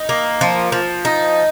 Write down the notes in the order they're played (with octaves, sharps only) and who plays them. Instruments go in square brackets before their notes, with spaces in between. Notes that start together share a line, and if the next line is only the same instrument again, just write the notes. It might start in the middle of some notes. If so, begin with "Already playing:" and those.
Already playing: [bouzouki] D#4
A#3
F3
F3
D#4